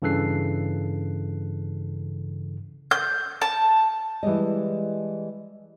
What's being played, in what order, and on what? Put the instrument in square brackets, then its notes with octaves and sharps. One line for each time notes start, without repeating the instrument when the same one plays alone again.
[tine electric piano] G2 C#3 E3 A4 F#6 C7
[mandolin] G6
A5
[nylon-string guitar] E3 G3 G#3 D#5